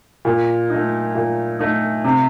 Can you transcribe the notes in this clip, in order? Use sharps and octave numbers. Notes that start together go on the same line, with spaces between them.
A#2
A3 D#4
A#2
A3 D#4
C3